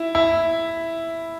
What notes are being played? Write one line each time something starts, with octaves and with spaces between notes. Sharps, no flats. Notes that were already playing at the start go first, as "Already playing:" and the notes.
Already playing: E4
E4